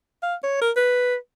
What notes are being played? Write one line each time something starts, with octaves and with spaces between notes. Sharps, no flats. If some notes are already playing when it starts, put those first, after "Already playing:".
F5
C#5
A#4
B4